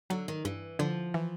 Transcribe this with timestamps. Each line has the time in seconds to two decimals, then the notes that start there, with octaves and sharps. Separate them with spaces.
0.10 D3 F#3
0.28 D#3
0.45 G2 E3
0.79 D3 F3
1.14 E3